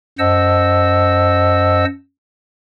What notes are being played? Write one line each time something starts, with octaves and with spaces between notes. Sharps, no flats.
F#2 C5 D#5 F#5 A5 E6